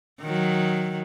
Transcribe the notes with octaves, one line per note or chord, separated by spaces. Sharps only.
D#3 F#3